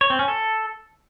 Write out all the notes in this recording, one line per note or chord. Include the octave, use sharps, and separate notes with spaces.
C#5
C4
C#4
A4